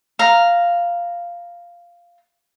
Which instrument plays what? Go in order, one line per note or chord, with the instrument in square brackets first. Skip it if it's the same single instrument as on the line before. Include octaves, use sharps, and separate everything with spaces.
[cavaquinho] F5 A#5